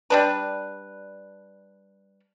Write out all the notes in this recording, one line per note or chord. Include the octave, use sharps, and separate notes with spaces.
G3 D4 B4